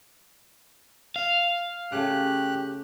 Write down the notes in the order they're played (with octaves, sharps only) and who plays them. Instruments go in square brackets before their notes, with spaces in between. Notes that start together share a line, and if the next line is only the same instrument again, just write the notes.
[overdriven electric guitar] F5
[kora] C#3 A3 [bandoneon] G4 F#6